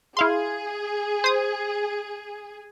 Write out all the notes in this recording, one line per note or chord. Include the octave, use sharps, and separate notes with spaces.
E4 G#4 F5 C6
C5 D#6